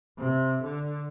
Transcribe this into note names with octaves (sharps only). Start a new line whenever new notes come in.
C3
D3